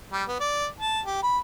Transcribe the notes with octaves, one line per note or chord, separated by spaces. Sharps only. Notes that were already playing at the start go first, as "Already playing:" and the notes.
G3
B3
D5
A5
G4
B5